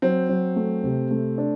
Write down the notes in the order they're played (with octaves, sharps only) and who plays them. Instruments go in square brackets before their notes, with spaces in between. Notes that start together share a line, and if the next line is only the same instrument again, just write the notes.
[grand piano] F#3 [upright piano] C4
[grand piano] F#3
A3
C3
A3
D4